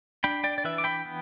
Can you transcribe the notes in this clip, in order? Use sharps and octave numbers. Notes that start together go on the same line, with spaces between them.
D4 G5 B5
D5 G5
D5
E3 B4 E5
D6
G5 B5
B3